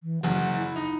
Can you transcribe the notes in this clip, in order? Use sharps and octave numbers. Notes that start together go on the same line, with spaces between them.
E3
F#1 F#2 F#5
E4
D#4